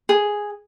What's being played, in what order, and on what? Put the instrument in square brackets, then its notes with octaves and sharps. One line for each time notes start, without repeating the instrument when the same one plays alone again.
[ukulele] G#4